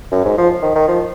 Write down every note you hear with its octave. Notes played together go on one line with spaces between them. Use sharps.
F#2
G#2
F3
D#3
D#3
F3